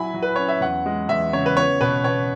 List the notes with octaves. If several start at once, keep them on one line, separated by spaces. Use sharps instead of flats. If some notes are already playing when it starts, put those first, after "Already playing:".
Already playing: F#3 E4 G#5 B5
F#3
B4
C#4 C#5
E5
E2 F#5
G#3
E2 E5
C#3 C#5
B4
B3 C#5
B2 B4
B2 C#5